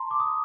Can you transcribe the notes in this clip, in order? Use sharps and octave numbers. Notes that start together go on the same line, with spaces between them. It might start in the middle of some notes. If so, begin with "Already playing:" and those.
Already playing: A5 A#5 C6
D6
D#6